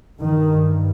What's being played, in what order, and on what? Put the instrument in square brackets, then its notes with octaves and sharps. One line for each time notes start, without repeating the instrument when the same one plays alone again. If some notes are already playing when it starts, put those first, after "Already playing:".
[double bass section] G2 D#3